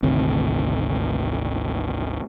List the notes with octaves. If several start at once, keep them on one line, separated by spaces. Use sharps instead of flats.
G#1 D2 C3